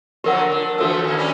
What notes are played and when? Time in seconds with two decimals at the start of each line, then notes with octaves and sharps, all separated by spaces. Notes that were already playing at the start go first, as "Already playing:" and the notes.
0.24 D3 F3 F#3 G4 A#4 F#5
0.52 D4
0.78 E3 F3 A3 F#4 A4 E6
1.04 D#3 A#3
1.17 G3 C#4 D4